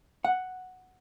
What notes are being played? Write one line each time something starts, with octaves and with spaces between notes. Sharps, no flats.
F#5